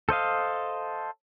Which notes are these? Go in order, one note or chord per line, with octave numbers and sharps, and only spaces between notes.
A4 C5 D#5 F5